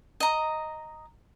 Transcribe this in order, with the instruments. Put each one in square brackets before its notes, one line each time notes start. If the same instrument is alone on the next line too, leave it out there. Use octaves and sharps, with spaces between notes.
[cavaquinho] D#5 A#5